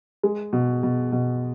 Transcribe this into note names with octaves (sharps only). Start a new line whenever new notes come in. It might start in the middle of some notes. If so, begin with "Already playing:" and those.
G#3
B2
B2
B2